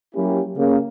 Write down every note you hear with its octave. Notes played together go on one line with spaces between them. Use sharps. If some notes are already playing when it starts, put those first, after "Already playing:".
F#3 A#3 C#4 E4 G4
C#3 A#3